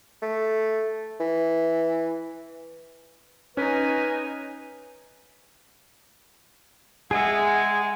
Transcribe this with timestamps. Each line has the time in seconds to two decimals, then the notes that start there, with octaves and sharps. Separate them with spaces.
0.22 A3
1.20 E3
3.57 C#4 D#4 B4 G#5
7.11 G#3 G#4 E5 F#5